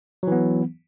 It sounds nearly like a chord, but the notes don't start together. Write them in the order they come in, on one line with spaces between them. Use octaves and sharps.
F#3 E3 B3